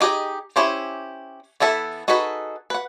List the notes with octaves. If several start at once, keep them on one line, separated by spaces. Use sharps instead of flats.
D#4 G4 G#4 D#5
C#4 E4 G4 C5
E3 B3 E4 A4 B5
D#4 F#4 G#4 A4 B4
B4 F#5